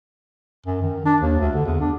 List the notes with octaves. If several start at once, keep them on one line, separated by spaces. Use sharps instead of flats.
F#2
D#3
D4
D#2
D2
D3
E2
D4